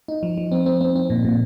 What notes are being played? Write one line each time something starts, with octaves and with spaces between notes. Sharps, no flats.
D#4
F3
F3
C4
C4
C4
C4
A#2
A#2